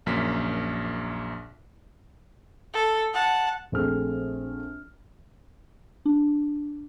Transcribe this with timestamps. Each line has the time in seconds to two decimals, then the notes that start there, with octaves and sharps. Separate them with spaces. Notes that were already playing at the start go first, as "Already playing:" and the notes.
0.06 A#1 F#2 A#3 B6
2.74 A4
3.13 F#5 A5
3.72 A#1 A3 C4 G#4 F6
6.06 D4